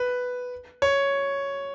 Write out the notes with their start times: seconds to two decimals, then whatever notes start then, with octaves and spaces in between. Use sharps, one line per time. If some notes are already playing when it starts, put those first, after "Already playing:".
Already playing: B4
0.82 C#5